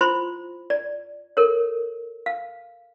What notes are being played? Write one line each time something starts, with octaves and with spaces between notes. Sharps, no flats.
E4 F4 C5 B5 C6
D5
A4 A#4 C#5
F5